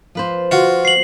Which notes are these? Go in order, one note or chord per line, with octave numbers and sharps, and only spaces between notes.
F3 B4 C5
F4 F#4
C7 F#7